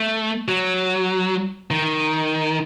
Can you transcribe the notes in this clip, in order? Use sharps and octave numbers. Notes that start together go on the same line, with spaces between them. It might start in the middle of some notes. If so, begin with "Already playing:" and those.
Already playing: A3
F#3
D#3